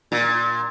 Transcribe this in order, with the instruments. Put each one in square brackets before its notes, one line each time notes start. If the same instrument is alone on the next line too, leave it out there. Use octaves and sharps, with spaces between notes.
[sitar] A#2